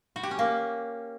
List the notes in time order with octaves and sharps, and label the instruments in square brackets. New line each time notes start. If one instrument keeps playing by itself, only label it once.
[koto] F#4
G4
C#4
A#3